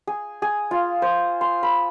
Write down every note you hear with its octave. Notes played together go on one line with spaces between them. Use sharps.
G#4
G#4
F4
C5
C6
B5